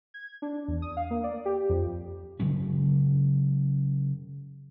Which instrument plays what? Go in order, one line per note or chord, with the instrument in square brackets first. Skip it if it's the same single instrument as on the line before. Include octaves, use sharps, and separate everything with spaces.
[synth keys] G#6
D4
E2
D#6
F5
A#3
D5
G4
F2
[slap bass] C#3 F#3 G#3 C#4